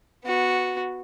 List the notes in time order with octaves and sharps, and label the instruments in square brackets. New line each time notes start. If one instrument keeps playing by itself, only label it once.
[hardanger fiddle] B3 F#4